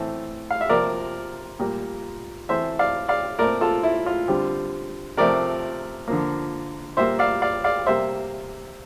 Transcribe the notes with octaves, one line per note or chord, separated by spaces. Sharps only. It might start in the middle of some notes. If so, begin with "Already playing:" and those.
Already playing: A2 E3 A3 C4
F5
E5
C3 F3 A#3 A#4 D5
A#2 G3 A#3
E3 A3 C4 C5 E5
D5 F5
D5 F5
A#2 A3 C4 A#4 D5
F4 A4
E4
F4
D3 G3 C4
C3 F3 A3 C4 A#4 D5
D3 F3 A#3
A#2 G3 A#3 C5 E5
D5 F5
D5 F5
D5 F5
C3 G3 A#3 C5 E5